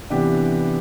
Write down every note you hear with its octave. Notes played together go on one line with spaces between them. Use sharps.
C3 E3 B3 D4 G4